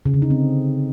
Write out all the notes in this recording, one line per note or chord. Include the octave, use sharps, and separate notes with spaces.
C#3
D3
D#4
C4